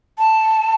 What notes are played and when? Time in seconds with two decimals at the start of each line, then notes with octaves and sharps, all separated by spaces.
0.19 A5